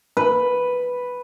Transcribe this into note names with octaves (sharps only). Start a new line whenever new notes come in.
B4